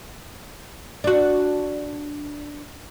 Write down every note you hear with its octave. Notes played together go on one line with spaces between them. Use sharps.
D4 F#4